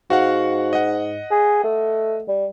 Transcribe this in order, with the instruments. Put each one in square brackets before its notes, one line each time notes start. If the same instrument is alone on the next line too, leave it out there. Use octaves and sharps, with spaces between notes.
[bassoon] G#2 [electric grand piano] F#4 F5 F#5
[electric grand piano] D#5 F#5
[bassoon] G#4
A3
G3